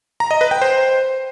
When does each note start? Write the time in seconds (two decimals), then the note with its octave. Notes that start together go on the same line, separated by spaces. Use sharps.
0.20 A#5
0.31 D#5
0.41 B4
0.51 G5
0.62 C5